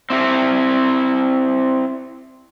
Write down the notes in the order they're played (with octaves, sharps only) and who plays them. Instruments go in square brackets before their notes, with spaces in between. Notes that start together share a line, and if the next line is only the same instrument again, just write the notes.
[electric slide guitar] C4 E4 G4